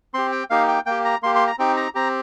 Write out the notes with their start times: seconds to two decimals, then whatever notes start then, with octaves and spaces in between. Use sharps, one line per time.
0.14 C4 G4 C6
0.32 G5
0.50 A#3 D#4 G4 F5
0.68 G5
0.86 A#3 G4 G5
1.05 A#5
1.23 A#3 G4 C6
1.35 C6
1.47 A#5
1.59 C4 D#4 G4 G5
1.77 A#5
1.95 C4 G4 A#5